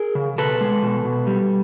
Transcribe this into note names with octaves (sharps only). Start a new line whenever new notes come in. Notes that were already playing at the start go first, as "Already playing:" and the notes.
Already playing: G#4 A#4
C#3
B2 A4 B4
G#3
B2
B2
G3